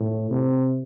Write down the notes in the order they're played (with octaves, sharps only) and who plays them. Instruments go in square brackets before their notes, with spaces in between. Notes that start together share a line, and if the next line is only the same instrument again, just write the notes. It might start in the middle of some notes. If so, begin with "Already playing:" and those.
Already playing: [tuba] A2
C3